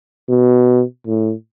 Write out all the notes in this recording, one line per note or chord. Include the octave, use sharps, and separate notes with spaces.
B2
A2